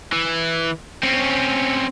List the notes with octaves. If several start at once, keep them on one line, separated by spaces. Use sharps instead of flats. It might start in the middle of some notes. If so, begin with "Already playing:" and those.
E3
C4 C#4